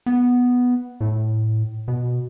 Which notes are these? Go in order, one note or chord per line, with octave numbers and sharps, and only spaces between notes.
B3
A2
B2